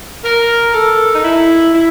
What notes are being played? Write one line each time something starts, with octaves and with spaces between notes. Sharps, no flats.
A#4
A4
D#4
E4
E4